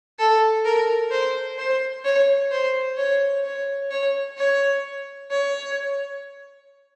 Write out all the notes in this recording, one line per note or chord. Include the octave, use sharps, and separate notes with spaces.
A4
A#4
C5
C5
C#5
C5
C#5
C#5
C#5
C#5
C#5